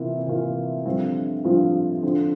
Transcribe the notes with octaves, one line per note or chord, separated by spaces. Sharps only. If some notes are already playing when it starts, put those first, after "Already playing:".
Already playing: C3 E3 A#3 F4
C3 E3 A#3 F4
G2 D3 F3 C4 F4
G2 D3 F3 C4 F4
D3 F3 C4